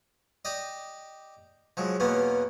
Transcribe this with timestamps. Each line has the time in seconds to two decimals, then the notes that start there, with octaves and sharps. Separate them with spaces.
0.45 G4 D5 D#5
1.77 F3 F#3 G#3
2.00 E2 B2 A#3 B3 C#4